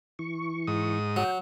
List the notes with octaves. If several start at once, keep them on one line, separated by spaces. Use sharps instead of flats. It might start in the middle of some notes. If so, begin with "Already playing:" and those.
E3 C#6
G#2 D#6
F#3 G5